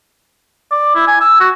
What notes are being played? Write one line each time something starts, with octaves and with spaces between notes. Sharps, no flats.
D5
E4
G#5
E6
F#4